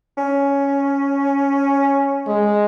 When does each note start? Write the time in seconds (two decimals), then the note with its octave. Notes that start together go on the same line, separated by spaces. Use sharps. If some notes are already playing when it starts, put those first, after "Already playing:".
0.17 C#4
2.27 G#3